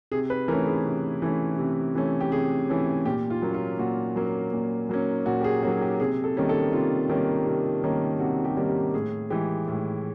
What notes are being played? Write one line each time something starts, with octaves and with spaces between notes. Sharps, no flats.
C3 G#4
B4
E3 A3 C#4 A#4
G#4
C3
E3 A3 C#4
C3
E3 A3 C#4
G4
C3 G#4
E3 A3 C#4
A#2 G4
F4
F#3 A#3 C#4
F4
A#2 F#4
F#3 A#3 C#4
A#2
F#3 A#3 C#4
A#2 F#4
G4
G#4
F#3 A#3 C#4 F#4
G4
C3 G#4
A4
D#3 G3 A#3 C#4
A4
C3 F4
D#3 G3 A#3 C#4
C3
D#3 G3 A#3 C#4
C3 F#4
G4
D#3 G3 A#3 C#4
G4
A2 G#4
E3 G#3 G4
A2